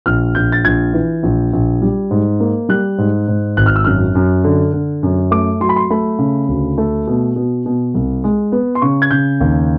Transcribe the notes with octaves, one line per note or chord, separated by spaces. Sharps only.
A#1 F6
A#1 G6
A6
A#1 G#6
E3
A#1
A#1
G3
G#2
A#3
G3 F#6
G#2
G#2
G#1 F#6
F6
E6
F#2 F6
F#2
D3
D3
F#2
A3 D6
F#3 C6
B5
C6
A3 B5
C#3
D2
A3
B2
B2
B2
C2
G#3
B3
C6
C#3 C#6
G#6
C#3 G6
D#2